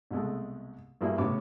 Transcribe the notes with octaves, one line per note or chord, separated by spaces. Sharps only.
C2 B2 G#3 A3
G2 F#3 A#3 E4 G#4
C#2 A2 F#3 B3 C#4 D6